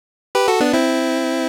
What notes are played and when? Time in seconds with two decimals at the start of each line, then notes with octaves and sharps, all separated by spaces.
0.35 G4 B4
0.48 F#4 A4
0.61 B3 D4
0.73 C4 E4